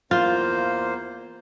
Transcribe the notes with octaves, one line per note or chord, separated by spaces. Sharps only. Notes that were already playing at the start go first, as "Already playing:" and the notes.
E2 A#3 F4 C5